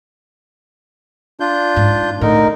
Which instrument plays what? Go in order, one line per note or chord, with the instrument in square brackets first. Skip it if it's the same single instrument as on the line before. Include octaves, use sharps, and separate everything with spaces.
[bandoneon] D4 F4 G6
[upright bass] G#2
[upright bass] A2 [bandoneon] D3 D#4 A#4